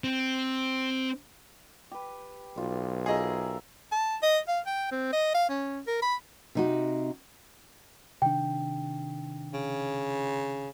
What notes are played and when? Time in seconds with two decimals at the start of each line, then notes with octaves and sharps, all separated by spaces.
0.04 C4
1.91 G4 B4
2.57 B1 F4
3.06 F4 G#4 A#4 D#5 E5
3.92 A5
4.23 D#5
4.48 F5
4.67 G5
4.91 C4
5.13 D#5
5.34 F5
5.50 C#4
5.87 A#4
6.02 B5
6.55 C3 D#4 F#4
8.22 C3 D#3 D4 G5
9.54 C#3